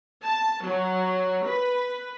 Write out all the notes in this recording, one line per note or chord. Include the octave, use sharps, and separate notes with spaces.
A5
F#3
B4